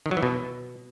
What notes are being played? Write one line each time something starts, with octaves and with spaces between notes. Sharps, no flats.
D#3
F#3
E3
B2